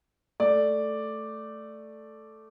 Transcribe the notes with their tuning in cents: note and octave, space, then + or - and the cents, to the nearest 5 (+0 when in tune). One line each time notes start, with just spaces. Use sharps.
A3 +0 D5 +0